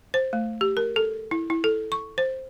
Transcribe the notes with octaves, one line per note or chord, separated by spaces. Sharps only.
C5
A3
G4
A#4
A4
E4
E4
A4
C#6
C5